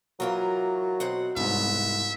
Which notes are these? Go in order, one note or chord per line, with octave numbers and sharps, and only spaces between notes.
E3 F#3 F4 A#4
B2 C4 F#5
C2 G#2 B3 E5